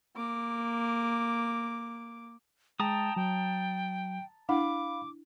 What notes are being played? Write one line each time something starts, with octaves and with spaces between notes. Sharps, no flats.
A#3 D6
G#3 G5 A5 A#5 D#6
F#3 G5
D4 E4 F5 F#5 B5 D6